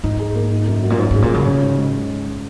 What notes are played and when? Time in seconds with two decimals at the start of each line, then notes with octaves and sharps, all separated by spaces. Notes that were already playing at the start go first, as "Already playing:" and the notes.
0.04 G#2 D#4
0.20 G#4
0.35 A#3
0.51 D#4
0.67 F#2
0.83 F#3
0.90 A#2
0.98 G#2 C#4
1.11 G#2 G#4
1.22 A#2
1.31 C#3 F#3
1.47 C#4
1.63 G#2
1.78 G#3